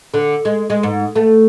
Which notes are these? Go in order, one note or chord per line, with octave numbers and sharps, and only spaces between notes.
D3
G#3
G#3
G#2
A3